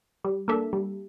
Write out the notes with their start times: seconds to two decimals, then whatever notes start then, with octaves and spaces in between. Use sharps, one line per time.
0.24 G3
0.48 A#3 D4 A4 E5
0.73 G3